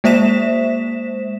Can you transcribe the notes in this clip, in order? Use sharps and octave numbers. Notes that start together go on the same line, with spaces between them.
G#3 A#3 C5 E5 B6 E7